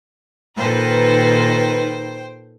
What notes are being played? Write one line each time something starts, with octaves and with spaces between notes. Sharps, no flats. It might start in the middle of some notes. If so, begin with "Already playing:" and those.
A#2 D#3 A4 B4 C5 G5